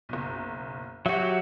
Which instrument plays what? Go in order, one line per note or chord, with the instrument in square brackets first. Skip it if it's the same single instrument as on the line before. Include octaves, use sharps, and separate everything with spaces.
[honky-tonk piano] F#1 B1
[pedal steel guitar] F#3 F#4 [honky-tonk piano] G4 E5